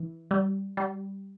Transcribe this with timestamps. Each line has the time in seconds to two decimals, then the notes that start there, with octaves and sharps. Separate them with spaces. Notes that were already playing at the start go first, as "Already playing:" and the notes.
Already playing: E3
0.31 G3
0.77 G3